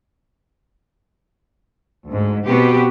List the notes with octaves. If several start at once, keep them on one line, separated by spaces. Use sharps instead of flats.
D2 G#2
B2 B3 C4 F#4 G4 B4